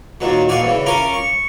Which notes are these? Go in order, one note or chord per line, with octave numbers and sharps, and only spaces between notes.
D#2 A#2 D#3 F#3
A1 A#2 F#4 D5 F5 G#5
C#3 E3
C#4 F4 A#4 G#5 A#5 D6
C#6